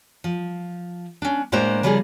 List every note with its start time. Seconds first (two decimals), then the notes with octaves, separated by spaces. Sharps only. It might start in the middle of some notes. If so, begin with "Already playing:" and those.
0.24 F3
1.22 C#4 D4
1.52 A2 G#3 A#3 D4 C5 A#5
1.83 C#3 F3 G3 A#3 G#4